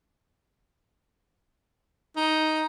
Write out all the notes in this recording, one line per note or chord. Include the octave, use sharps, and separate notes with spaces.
D#4